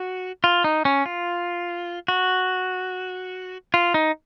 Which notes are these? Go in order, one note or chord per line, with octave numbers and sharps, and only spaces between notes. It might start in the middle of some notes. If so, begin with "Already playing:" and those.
Already playing: F#4
F4
D#4
C#4
F4
F#4
F4
D#4